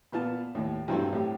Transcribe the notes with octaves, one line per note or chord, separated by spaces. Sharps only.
A#2 B3 F4 A5
D#2 A2
G2 E3 F#3 A3 C4 E4
A2 G4